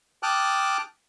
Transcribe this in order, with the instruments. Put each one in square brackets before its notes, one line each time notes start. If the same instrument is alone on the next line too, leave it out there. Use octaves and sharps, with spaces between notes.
[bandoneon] G5 A5 D6 D#6 F6 F#6